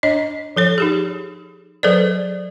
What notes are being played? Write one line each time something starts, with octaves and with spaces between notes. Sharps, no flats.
D4 C#5 D#5
F3 A4 C#5
D#4 G4 G#4
F#3 G#4 A4 B4 C5 D5